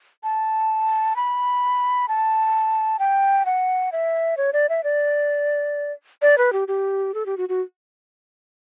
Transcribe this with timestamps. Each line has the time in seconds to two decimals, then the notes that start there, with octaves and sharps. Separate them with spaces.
0.23 A5
1.16 B5
2.08 A5
2.99 G5
3.46 F#5
3.92 E5
4.37 C#5
4.53 D5
4.69 E5
4.84 D5
6.22 D5
6.38 B4
6.53 G4
6.68 G4
7.14 A4
7.26 G4
7.37 F#4
7.49 F#4